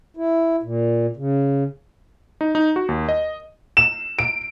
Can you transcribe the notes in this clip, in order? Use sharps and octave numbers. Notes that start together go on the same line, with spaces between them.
E4
A#2
C#3
D#4
D#4
F#4
D#2
D#5
E7
D7